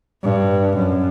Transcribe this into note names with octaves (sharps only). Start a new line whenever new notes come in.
G2
F#2